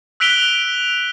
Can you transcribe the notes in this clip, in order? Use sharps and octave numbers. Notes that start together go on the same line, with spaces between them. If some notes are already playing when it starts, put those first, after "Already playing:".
E6 F#6 B6 D7 F7 G7